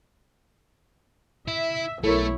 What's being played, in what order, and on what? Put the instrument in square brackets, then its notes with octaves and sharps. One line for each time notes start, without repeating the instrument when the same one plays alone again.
[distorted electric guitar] E4 [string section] E5
[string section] B1 [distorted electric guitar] A3 [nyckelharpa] E4 C#5 [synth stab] A4 A#4